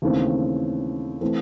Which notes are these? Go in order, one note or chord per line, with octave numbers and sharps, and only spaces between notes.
D#2 C#3 E3 A3 C4
E3 A3 C4